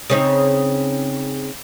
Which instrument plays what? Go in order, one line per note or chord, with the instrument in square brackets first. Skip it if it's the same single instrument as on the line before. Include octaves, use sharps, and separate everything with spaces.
[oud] C#3 C4 D#4